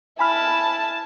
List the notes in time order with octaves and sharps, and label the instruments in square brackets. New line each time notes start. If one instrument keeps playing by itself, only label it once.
[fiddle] E4 A5 [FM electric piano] G#5 B5 F6